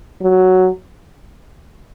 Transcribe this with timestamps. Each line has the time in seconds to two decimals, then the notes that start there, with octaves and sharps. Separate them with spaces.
0.21 F#3